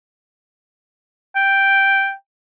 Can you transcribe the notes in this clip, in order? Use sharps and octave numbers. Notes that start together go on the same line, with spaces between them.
G5